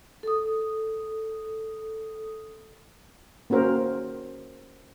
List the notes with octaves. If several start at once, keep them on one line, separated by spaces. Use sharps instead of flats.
A4 D#6
A#3 C#4 F#4 A#4 C5